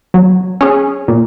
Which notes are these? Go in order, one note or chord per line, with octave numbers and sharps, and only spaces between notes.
F#3
C#4 G#4
A#2